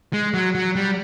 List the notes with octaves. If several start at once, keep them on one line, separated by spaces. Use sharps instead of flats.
G#3
F#3
F#3
G3